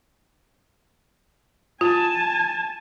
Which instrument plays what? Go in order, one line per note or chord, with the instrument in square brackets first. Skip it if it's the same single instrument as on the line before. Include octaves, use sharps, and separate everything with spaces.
[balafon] F4 [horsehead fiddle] G#5 A5